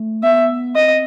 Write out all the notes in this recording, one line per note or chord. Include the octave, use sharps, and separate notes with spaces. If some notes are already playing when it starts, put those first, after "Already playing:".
Already playing: A3
B3 E5
C4 D#5